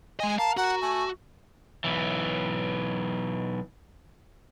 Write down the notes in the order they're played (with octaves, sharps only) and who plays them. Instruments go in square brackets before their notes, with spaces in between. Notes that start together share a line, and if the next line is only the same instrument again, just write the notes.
[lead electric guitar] G#3 D#5 [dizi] G#5
[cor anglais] A#4 [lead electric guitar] F5 [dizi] A5
[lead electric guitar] F#4 [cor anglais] A#4 [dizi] F#5
[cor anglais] A3 [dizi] G#5
[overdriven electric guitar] B1 E3